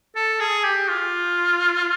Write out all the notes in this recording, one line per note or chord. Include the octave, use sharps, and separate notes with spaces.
A4
G#4
G4
F4